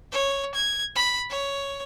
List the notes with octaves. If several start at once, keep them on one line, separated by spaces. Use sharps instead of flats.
C#5
G#6
B5
C#5